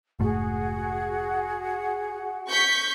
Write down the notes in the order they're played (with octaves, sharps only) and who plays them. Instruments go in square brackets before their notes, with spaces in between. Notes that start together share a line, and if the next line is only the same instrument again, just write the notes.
[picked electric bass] F1 G#2 A3 [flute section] F#4 G#4 F#5
[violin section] C#6 G6 B6